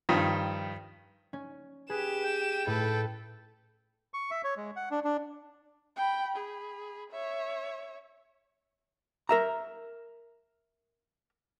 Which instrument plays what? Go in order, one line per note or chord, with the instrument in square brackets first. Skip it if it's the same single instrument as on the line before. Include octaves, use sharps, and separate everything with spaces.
[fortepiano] G2 D#3 F3
[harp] C#4
[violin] G4 E7 [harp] G#4 [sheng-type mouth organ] B4
[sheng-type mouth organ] G5
[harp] A2 [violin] A4 B4
[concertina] C#6
E5
C#5
G#3
F#5
D4
D4
[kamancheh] G5 B5
G#4 B5
C#5 E5
[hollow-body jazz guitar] A#4 E5 A#5